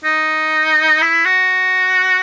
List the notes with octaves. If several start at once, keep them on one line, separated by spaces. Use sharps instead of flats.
D#4
E4
F#4